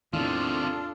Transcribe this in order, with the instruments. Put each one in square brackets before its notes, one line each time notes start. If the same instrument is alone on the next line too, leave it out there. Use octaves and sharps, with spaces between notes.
[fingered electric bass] E2 A2 [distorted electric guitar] C3 D#3 [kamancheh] D4 A4 [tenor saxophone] F4